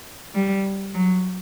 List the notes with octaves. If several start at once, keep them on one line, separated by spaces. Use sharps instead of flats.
G3
F#3